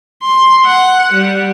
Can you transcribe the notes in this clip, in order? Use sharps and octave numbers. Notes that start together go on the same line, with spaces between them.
C6
F#5
G3